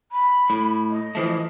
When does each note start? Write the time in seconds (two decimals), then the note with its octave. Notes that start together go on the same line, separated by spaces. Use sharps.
0.12 B5
0.50 A2
0.90 D#5
1.15 E3 F3 A3